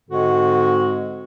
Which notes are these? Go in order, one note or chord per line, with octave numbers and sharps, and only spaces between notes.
G#2 D3 G#3 C4 F#4